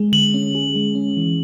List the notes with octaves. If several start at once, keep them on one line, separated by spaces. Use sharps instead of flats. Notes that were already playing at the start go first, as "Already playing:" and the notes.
Already playing: G#3 G#4
D3 F#7
C#4
G#4
G#3
C#4
E3